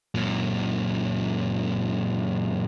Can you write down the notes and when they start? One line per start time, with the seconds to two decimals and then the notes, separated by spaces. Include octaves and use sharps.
0.15 F#2 A#2